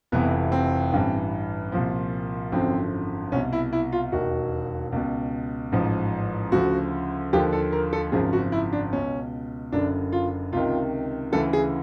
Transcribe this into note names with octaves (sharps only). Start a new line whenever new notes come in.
F1 F2 C3 E3 B3
C4
A1 G2 E3
C2 A#2 F3
G#1 F#2 D3 F3 C4
C2 B2 C#4
E4
E4
F4
E1 D#2 D#3 F#4
C#2 B2
A1 G#2 F3
D2 C#3 F3 F#4
D#2 D3 F3 G4
A4
A#4
A4
G#1 F#2 C#3 F3 G#4
F#4
E4
D4
C#2 B2 C#4
F#1 F#2 D3 D4
F4
C#2 C3 D#3 F4
D2 C#3 E3 A4
G#4